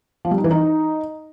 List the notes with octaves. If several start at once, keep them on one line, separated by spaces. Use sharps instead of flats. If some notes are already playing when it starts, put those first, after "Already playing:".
F3
G3
D#4
E3
D#4